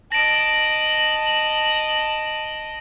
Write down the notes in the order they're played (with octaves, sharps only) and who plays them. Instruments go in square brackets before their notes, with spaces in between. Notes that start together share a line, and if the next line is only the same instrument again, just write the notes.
[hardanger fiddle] D#5 A5 [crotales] A#6 D7 [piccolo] F#7